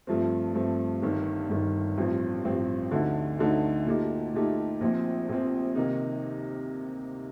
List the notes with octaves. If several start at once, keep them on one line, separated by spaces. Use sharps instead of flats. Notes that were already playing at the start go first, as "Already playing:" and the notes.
G2 F3 A3 C4
G2 F3 A3 C4
G1 G2 D#3
G1 G2 D#3
A1 G2 F3 C4
A1 G2 F3 C4
D2 D3 A3 D#4
D2 D3 A3 D#4
A#2 A3 D#4 G4
A#2 A3 D#4 G4
A#1 A#2 F3 C4
A#1 A#2 F3 C4
C3 D#3 A#3 D#4